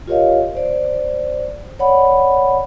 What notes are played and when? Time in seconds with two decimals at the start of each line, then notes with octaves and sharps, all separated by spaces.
0.07 F4 G4 A#4 C#5 D#5 F5
0.55 C5 D5
1.79 C#5 D5 F#5 B5